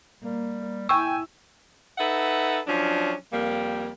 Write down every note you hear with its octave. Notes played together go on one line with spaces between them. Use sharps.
G3 A#3
E4 G5 G#5 C#6 E6
D#4 A4 B4 E5 F#5
F3 F#3 C#4 D4
F2 G3 A#3